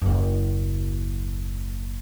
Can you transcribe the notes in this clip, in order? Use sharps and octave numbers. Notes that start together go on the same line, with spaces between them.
F#1 D#2